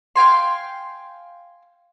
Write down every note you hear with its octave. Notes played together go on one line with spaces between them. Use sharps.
F5 G5 G#5 C6